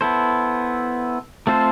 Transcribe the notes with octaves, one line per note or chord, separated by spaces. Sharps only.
B3 E4 A4 C5
A3 C4 F4 A4 C5